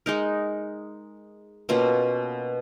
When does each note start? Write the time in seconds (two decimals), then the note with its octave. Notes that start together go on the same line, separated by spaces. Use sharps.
0.06 G#3 D#4 A#4
1.69 B2 A#3 C#4 F4